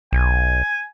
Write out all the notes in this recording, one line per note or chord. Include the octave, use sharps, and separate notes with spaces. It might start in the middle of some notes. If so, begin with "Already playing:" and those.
B1 G#5